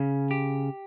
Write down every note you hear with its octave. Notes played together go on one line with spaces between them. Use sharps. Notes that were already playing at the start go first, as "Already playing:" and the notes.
Already playing: C#3 C#4
G4